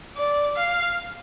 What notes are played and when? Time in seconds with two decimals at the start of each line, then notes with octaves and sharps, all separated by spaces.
0.17 D5
0.56 F5